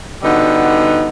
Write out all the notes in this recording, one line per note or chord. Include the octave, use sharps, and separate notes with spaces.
D3 G3 B3 D#4 F#4